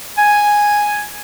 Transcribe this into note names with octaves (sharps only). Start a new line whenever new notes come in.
G#5